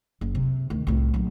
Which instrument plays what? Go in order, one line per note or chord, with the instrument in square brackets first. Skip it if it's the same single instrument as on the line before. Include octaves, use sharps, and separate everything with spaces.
[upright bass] F#1
C3
D2 D#3
C2 A2
A#1 F#3